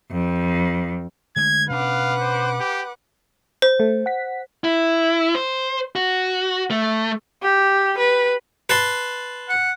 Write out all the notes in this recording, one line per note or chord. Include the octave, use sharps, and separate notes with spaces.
F2
D3 G#3 A3 G#6
B2 C#4 D4 B4 F5 F#5 D6
C5
G4
C5
A3
F#5 B6
E4
C5
F#4
A3
G4
B4
B4 A5 C6
F#5